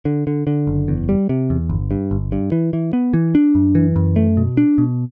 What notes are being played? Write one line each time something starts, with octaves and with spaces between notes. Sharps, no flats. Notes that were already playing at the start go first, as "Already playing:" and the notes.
D3
D3
D3
F#1
E2
G3
C3
E2
G1
G2
G1
G2
E3
E3
B3
E3
D4
F#2
E3
F#2
A3
B2
D4
B2